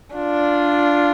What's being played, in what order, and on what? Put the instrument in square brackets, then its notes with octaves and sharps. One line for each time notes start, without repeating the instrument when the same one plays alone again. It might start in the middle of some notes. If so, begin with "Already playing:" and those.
[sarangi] D4 [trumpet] F4